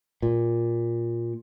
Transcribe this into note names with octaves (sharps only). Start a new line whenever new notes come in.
A#2